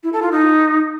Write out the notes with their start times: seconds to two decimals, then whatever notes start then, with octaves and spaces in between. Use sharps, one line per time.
0.03 E4
0.13 A4
0.22 F4
0.31 D#4